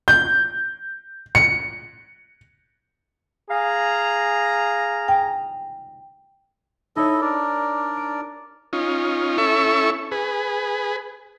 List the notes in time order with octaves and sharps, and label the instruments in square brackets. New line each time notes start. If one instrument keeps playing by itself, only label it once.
[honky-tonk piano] G6
C#7
[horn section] G#4 F5 A#5
[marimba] G5
[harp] D#4 C#5 [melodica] E4 A4 D#5
[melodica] D4 A#4 D5
[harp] D7
[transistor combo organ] C#4 D#4 F4
C#4 E4 A4 E5 C#6
G#4 B4